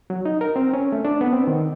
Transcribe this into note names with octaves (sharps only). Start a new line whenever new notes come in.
F#3
D#4
A#4
C4
C#4
A3
D4
B3
C4
D#3